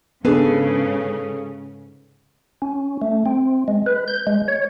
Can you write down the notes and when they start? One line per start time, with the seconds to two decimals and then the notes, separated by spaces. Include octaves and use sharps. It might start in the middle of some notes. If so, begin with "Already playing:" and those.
0.25 G#2 C#3 B3 C#4 D4 G#4 A4 B4
2.62 C#4
3.02 A3
3.26 C4
3.68 G#3
3.86 B4
4.08 G6
4.27 G#3
4.48 C#5